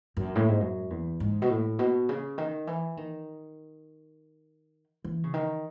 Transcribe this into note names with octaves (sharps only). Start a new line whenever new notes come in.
F#2
A2
G#2
F#2
E2
G#2
B2
A2
B2
C#3
D#3
E3
D#3
E3
C#3
D#3